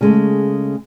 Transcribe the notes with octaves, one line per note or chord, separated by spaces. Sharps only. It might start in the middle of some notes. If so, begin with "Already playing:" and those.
C#3 G#3 A3